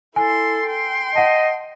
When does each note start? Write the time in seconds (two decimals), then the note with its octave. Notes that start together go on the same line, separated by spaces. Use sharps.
0.16 E4 A4 G#5 C6
0.68 G5 C6
1.15 D#5 F#5 A5